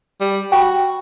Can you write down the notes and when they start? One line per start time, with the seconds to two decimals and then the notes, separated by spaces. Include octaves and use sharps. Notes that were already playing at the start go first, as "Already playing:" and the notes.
0.21 G3
0.52 F#4 G5 B5